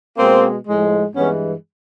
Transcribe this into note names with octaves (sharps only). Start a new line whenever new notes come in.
B2 G#3 A#3 C4
A2 F3 G#3
G2 E3 G#3 B3 C#4